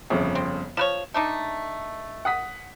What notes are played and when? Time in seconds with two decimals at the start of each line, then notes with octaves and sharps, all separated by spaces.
0.10 G1 F2 C#3
0.35 C4
0.77 F3 B4 C#5 E7
1.14 A3 D4 D#4
2.25 F#5 D#6 B6